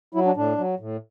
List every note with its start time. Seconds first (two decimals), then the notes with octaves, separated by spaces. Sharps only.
0.14 F#3 E4
0.25 D4
0.36 A2 D4
0.58 F#3
0.79 A2